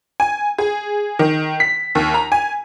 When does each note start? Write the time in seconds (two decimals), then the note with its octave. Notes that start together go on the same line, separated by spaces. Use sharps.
0.20 G#5
0.58 G#4
1.19 D#3
1.60 B6
1.95 D#2
2.14 A#5
2.32 G#5